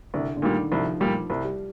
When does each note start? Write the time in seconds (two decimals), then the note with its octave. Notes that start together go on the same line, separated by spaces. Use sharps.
0.14 C2 D3
0.37 D3
0.42 A#2 D#3 G3
0.72 C2 F3
1.00 A#2 G3
1.30 C2
1.44 G3